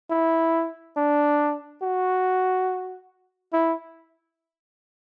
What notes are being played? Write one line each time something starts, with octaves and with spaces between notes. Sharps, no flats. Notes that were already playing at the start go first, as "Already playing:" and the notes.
E4
D4
F#4
E4